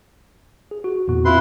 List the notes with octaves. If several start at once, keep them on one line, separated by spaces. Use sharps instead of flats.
G#4
F#4
E2 A#2 F#4
C4 E4 F4 B4 C6